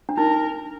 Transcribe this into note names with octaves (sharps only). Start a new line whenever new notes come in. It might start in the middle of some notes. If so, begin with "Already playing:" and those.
D4
D#4 A#4